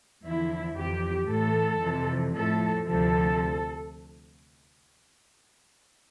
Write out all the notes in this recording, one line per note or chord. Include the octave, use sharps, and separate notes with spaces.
E2 D3 F3 E4
F2 E3 G4
A2 E3 A4
F2 C3 E3
A2 F3 A4
D2 C3 F3 A4